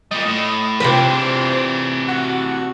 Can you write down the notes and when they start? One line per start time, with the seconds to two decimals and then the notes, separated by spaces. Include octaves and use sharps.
0.11 A#2 G3 D#5
0.25 A2
0.80 C3 E3 D4 F4 B4 C5
2.08 F#4